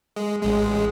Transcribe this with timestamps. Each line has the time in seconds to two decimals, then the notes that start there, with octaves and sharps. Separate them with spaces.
0.16 G#3
0.43 A1 G#3